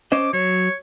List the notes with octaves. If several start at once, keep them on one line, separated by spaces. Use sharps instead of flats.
C#4 C5 D#5 D6
F#3 C#5